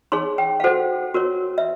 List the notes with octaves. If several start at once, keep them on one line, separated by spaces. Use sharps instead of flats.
D#4 G#4 C#5 C6
G5
F5
F#4 A4 C5 F#5
F#4 A#4 C#5
E5